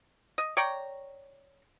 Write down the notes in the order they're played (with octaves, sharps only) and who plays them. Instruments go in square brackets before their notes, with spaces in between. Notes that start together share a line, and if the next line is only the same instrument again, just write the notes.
[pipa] D#5
C#5 D5 G5 A#5